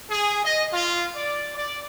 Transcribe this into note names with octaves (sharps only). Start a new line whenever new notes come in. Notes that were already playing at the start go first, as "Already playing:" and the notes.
G#4
D#5
F4
D5
D5